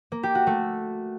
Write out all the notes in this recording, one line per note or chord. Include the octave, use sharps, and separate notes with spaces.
A#3
G4
F#4
A3